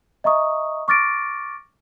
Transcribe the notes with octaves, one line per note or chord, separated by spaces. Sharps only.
D#5 E5 A#5 C#6 D#6
C#6 D6 F6 A6 A#6 D7